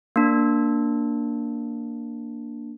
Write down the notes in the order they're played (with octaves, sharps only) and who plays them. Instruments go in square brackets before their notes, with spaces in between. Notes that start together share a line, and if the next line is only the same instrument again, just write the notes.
[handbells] A#3 D4